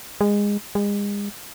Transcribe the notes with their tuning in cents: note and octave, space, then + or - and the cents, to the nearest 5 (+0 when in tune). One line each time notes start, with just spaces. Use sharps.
G#3 -20
G#3 -35